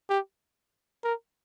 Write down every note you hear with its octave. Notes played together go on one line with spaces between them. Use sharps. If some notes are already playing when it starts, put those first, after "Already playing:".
G4
A#4